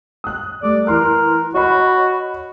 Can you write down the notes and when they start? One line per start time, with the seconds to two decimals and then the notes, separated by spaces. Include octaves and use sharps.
0.24 D#6 F#6
0.62 G3 A3 D5
0.87 E3 A#4 C6 F#6
1.54 F#4 C#5 D#5 B5